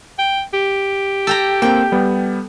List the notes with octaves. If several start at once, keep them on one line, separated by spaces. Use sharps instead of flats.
G5
G4
A4 G5 A#5
A#3 C4 G5
G3 B3